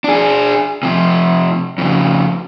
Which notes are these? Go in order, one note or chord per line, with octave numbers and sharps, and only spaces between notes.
D4 G#4
C3 F3
F2 C#3